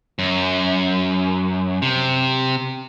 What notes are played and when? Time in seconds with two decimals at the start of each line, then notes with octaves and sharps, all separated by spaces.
0.19 F#2
1.82 C3